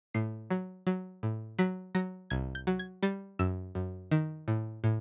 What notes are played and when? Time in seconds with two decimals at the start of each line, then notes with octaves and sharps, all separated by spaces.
0.14 A2 C7
0.50 F#3
0.87 F#3
1.23 A2
1.59 F#3 B6
1.95 F#3 A#6
2.30 C2 G#6
2.55 G6
2.67 F#3
2.79 G#6
3.03 G3 A6
3.39 F#2 E6
3.75 F#2
4.11 D#3
4.48 A2
4.84 A2